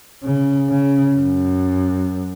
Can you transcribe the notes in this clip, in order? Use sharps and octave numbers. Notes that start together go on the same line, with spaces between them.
C#3
C#3
F#2